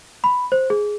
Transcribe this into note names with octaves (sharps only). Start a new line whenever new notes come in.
B5
C5
G#4